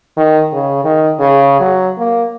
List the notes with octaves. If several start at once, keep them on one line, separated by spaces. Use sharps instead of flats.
D#3
C#3
D#3
C#3
F#3
A#3